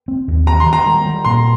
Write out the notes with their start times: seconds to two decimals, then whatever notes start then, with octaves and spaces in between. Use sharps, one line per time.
0.08 C4
0.28 D#2
0.47 D#3 A#5
0.60 C6
0.66 D#3
0.73 A#5
0.86 G3
1.06 G3
1.25 A#2 C6